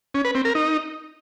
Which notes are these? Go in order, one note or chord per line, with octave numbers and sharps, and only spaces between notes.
C#4
B4
C4
A#4
D#4